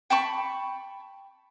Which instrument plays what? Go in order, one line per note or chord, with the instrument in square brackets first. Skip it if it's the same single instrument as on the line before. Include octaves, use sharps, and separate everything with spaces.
[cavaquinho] G5 A5 B5 C#6